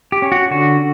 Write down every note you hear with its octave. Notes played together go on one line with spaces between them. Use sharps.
G4
C#4
F#4
D3 F#4